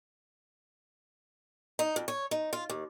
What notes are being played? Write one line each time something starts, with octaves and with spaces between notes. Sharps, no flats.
D#4
F2
C#5
D#4
F4
D#2